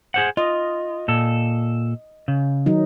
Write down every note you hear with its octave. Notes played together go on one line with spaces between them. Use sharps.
G#4 C5 F#5
F4 D#5
A#2 A4
C#3
D#3 F#3 D#4